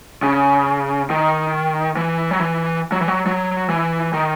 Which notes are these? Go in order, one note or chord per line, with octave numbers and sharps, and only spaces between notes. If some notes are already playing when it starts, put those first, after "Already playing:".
C#3
D#3
E3
F#3
E3
F#3
E3
F#3
F#3
E3
D#3